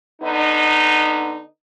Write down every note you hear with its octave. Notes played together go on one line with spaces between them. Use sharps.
D3 B3 D#4